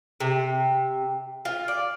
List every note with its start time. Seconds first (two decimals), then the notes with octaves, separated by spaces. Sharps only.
0.20 C3
1.45 F4
1.68 D5